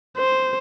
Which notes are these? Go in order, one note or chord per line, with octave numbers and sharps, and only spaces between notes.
C5